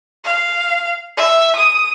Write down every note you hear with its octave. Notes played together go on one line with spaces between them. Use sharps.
F5
E5
D#6